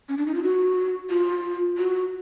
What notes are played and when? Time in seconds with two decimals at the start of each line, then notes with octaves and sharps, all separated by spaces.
0.09 C#4
0.18 D4
0.26 D#4
0.34 F4
0.43 F#4
1.10 F4
1.78 F#4